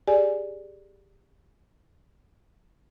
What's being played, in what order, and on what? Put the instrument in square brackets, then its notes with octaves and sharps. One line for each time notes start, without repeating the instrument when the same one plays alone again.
[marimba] G4 G#4 D5 G#5